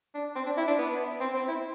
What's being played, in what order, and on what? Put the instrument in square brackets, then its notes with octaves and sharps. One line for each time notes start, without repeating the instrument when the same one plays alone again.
[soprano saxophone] D4
C4
D4
E4
D4
B3
C4
C4
E4